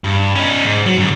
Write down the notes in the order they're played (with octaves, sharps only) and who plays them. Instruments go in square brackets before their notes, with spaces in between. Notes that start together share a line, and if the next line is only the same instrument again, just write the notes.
[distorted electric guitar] G2
C#4 D#4
G#2
F#3
G#2 D3